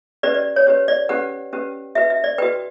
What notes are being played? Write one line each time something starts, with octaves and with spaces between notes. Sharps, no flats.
C#4 G4 B4 D5
D5
C#5
C#4 G4 B4 C#5
D5
C#4 G4 B4 F#5
C#4 G4 B4
F#4 B4 E5
E5
D5
F#4 B4 G5